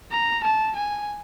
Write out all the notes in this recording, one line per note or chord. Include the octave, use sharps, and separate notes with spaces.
A#5
A5
G#5